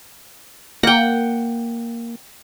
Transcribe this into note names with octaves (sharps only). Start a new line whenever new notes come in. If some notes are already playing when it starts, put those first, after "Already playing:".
A#3 F#5 G5